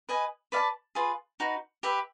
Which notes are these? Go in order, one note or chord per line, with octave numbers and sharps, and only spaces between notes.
B4 D#5 G#5
B4 D5 F5 A5
F4 G#4 B4
D#4 F#4 B4
G4 B4 E5